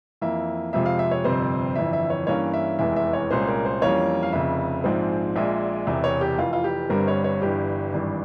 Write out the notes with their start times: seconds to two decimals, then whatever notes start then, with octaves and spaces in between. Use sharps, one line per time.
0.21 F2 E3 A#3 E5
0.73 F2 C3 F3 G#3 E5
0.86 F5
0.99 E5
1.11 C#5
1.24 G1 F2 C3 G3 C4 C5
1.75 G1 F2 E3 E5
1.93 E5
2.10 C#5
2.27 G2 E3 A#3 C#4 C#5
2.54 E5
2.79 F1 E2 E3 G#3 E5
2.96 E5
3.13 C#5
3.31 C2 A#2 G#3 C#4 C5
3.48 A#4
3.65 C5
3.82 F2 E3 G3 A#3 C#4 C#5
4.23 F5
4.33 F1 F2 C#3 E5
4.84 A#1 G#2 F3 G#3 C4
5.36 A#1 A#2 G#3 E5
5.87 E1 E2 C3 E5
6.04 C#5
6.21 G4
6.38 F1 F2 E3 F4
6.53 F4
6.64 G4
6.89 G1 G2 G3 C4 A#4
7.08 C#5
7.24 C#5
7.42 G1 G2 E3 G4
7.93 G#1 G2 E3